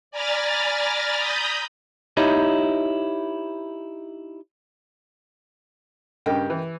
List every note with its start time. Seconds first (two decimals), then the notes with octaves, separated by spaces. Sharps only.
0.11 D5 G#5 A#5 B5 F6 A6
1.15 A#5 B5 D#6 G6
2.17 D#4 E4 G4 C#5 D#5
6.26 G2 C#3 G4 A#4 D#5 G5
6.50 E3